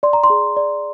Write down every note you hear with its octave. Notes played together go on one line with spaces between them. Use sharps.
D5 C6
A#5
C6
G#4
D5